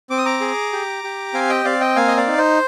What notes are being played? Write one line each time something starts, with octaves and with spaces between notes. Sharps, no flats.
C4 D6
D#6
A#5 D6
G#4
G4
G4
C4 F5 G#5
D#5 G5
C4 D5 F5
D#5 G5
A#3 F5 G#5
D#5
D5 F5
D#4
C5